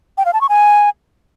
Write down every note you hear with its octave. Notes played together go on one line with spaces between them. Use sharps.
G5
F5
A5
C#6
G#5